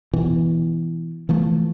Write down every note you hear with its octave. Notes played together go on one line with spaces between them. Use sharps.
B2 E3
E3 F3 A3